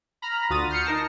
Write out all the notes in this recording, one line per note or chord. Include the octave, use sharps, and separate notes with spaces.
A#5 B5 F6
D2 F4 F#4 D#6 A6 D#7
F6 G6 C7 C#7
D#4 A#4 A5 A#6